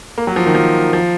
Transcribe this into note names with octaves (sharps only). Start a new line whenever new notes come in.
A#3
F#3
F3
D#3
F3
F3